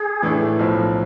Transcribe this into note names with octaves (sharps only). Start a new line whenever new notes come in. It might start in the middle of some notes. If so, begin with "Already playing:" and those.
Already playing: G#4
A2 E3 A3 D4
B1 A2 F3